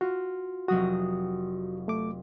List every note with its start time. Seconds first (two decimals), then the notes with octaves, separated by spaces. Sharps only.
0.01 F4 F#4
0.68 F1 F#3 F#4 D#6
1.88 A3 D6